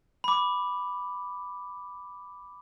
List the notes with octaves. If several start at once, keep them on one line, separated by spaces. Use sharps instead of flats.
B5 D6